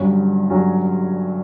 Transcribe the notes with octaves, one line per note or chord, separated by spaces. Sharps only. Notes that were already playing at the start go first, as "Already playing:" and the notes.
Already playing: G1 G2 F#3 C#4
G1 G2 F#3 C#4